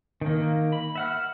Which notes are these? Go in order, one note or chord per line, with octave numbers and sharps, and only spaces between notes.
D#3 A#3
B5
E5 F#5 F6